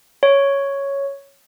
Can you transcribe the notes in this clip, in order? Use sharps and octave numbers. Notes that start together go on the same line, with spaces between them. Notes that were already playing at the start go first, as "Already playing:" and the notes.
C#5